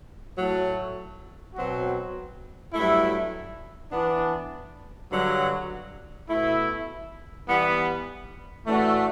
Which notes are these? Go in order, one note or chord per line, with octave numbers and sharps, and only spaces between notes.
A2 F#3 A3
B2 F#3 C4 F#4
G2 F#3 A3 E4
E3 B3 D4
G2 D3 F#3
B2 A3 E4
E3 G3 B3
A2 E3 A3 D4 F#4